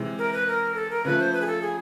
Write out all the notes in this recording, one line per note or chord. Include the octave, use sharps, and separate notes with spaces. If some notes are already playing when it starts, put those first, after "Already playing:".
Already playing: C3 E3 G#3
A#4
B4
A#4
A4
A#4
C#3 F3 A3 B4
C5
B4
G#4
A4
G#4